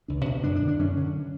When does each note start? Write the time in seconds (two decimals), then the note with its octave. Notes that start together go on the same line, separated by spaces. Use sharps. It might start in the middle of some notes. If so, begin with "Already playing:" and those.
0.08 C#2 D4
0.26 B2
0.44 F#2 D4
0.56 D4
0.62 D3
0.68 D4
0.79 F#2 C#4
0.97 D3